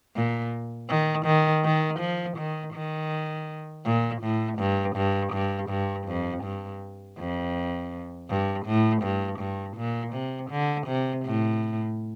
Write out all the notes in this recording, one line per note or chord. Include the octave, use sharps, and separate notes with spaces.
A#2
D#3
D#3
D#3
F3
D#3
D#3
A#2
A2
G2
G2
G2
G2
F2
G2
F2
G2
A2
G2
G2
A#2
C3
D3
C3
A2